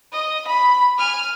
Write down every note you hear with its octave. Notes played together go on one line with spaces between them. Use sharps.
D#5
B5
G#5 F6